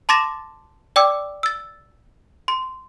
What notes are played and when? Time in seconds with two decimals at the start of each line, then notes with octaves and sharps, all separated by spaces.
0.09 A5 C6 D6 A6 A#6 E7
0.96 D5 G5 D6 E6
1.43 E6 A6
2.48 C6